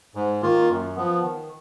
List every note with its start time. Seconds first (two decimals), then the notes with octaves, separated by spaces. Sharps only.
0.15 G#2
0.42 D#3 A#3 F4
0.69 F#2
0.96 F3 B3
1.22 D#3